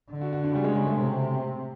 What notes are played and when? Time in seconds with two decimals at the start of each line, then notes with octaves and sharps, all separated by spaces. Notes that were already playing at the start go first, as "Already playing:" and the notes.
0.11 D3
0.21 F#4
0.33 F#4
0.44 D4
0.54 C#3 G3
0.64 G#3
0.76 G#3
0.87 A3
0.97 C3